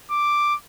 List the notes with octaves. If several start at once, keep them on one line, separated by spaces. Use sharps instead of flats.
D6